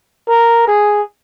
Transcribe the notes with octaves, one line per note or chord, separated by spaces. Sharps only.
A#4
G#4